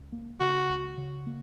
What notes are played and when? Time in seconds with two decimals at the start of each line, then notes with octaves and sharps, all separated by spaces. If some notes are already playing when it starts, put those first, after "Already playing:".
Already playing: C#2
0.12 A#3
0.40 C#3 F#4
0.69 C#2
0.97 C#3
1.26 A#3